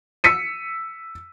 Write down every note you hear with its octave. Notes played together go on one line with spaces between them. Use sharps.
E6 B6 C#7 D#7